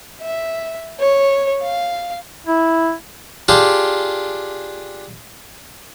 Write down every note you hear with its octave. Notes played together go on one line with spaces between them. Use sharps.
E5
C#5
F5
E4
D4 F4 G4 G#4